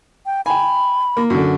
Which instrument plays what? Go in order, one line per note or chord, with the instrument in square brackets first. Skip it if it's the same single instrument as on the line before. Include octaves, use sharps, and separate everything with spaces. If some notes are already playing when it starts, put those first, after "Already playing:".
[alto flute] G5
[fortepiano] G5 G#5 [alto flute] B5
[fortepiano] A#3
F#2 D3